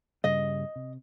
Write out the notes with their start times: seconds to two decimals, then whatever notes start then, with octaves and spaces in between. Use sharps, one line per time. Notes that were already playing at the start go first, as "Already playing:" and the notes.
0.24 G2 C#3 G3 D#5
0.76 C3